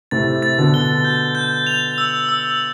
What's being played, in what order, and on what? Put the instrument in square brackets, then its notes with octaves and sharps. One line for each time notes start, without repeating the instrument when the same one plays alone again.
[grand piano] A2 C3 [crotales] A6
[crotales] A6
[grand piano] B2 D3
[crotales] G7
G6
G6
F7
E6
E6